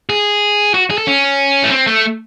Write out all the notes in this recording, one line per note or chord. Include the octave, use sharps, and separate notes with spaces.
G#4
F#4
G#4
A4
C#4
A3
C4
A3